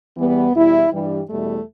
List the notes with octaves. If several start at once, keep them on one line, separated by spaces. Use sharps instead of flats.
E2 E3 G3 B3
E2 B2 G3 E4
G2 E3 G3
E2 B2 G3 A3